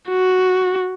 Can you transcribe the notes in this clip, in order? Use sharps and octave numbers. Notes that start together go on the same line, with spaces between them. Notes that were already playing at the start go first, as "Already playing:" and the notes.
F#4